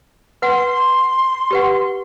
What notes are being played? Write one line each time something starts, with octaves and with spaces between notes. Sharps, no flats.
B4 F#5 C6
G4 B4 F#5